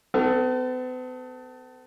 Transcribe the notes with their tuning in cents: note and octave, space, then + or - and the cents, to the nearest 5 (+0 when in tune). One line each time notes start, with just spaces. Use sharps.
B3 +45 A4 +10